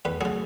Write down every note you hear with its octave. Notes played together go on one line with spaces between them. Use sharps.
E2 B4
C#3 F#3 G#4